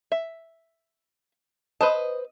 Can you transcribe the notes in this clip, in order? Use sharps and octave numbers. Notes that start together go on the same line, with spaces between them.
E5
B4 C5 D#5 A5